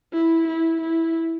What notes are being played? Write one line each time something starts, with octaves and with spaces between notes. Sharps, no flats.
E4
E4
E4